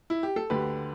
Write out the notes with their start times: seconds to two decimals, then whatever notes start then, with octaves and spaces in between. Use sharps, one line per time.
0.10 E4
0.23 G4
0.36 A4
0.50 D2 D3 G4 B4